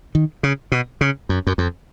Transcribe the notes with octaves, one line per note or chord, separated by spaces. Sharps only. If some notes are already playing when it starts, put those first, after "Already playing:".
D#3
C#3
B2
C#3
F#2
F#2
F2